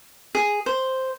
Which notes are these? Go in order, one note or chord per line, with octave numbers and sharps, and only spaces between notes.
G#4
C5